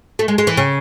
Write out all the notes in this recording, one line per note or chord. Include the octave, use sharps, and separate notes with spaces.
A3
G#3
G#3
E3
C#3